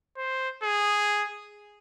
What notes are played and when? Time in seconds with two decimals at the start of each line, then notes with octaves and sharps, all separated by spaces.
0.17 C5
0.63 G#4